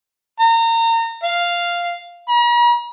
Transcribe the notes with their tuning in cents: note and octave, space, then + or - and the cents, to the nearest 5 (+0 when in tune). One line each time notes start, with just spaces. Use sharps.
A#5 -30
F5 -5
A#5 +45